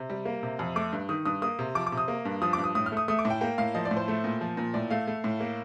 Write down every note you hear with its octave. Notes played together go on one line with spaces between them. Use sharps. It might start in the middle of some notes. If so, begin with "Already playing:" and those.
Already playing: C3
G3
A#3
C3
F2
A3 D6
G2
D#3 D#6
G2 D#6
A#3 D#6
C3
F3 D6
D6
C3
D#6
A#3
G2
F3 D#6
G2 D6
D#6
A2 D#6
F6
A3
D#6
A3 D#6
D6
A2
G5
A#3 G5
A2 F5
F3 D#5
D5
A2
C5
A3
A#2
F3
A#2
A2 D5
A3 F5
A3
A2
A#3